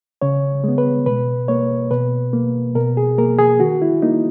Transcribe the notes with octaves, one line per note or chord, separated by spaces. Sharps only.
C#3 C#5
G#3 B3
B4
B2 B4
A#3 C#5
B2 B4
A#3
B2 A#4
G#4
A#3 A#4
G#4
D#3 F#4
E4
A#3 D#4